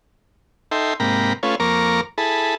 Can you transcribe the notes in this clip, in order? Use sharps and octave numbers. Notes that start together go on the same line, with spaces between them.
D#4 A4 E5 G5 C6
G#2 C3 A#3 G5 A#5 B5
A3 C#4 F4 B4 C#5
F2 A#3 A#4 A#5 C#6 D6
E4 G#4 A4 A5 B5